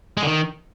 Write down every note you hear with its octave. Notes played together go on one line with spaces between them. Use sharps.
G#3
D3
D#3